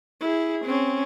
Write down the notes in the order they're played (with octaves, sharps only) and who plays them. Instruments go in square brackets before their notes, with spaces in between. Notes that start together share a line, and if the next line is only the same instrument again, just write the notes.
[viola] E4 G#4
C4 C#4